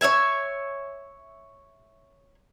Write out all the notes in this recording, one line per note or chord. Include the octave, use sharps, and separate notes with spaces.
C#5 D5 E5 G#5